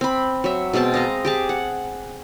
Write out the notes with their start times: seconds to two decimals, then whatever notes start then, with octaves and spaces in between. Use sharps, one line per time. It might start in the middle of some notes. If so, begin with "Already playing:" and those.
0.01 C4 B5
0.44 F#3 E5
0.73 B2 G#3 C4 A5
0.94 D#5 F5 A#5
1.25 G4 G#4 A5
1.49 F#5